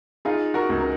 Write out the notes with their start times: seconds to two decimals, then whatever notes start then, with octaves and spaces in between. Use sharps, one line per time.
0.25 D#4 F4 G#4
0.54 F#4 A#4
0.69 C#2
0.79 A#4